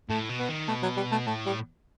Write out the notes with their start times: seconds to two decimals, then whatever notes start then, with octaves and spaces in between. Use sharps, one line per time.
0.09 A2 A3
0.29 B2
0.39 B3
0.48 D#3
0.68 B2 A3
0.83 F#3
0.97 G3
1.11 A3
1.27 A2 A3
1.46 G3